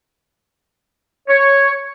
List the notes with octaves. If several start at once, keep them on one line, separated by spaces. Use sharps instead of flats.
C#5